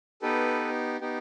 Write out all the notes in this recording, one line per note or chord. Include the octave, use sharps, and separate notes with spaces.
B3 D#4 G4 A4 B4
B3 D#4 G4